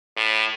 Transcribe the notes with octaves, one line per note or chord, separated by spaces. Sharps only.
A2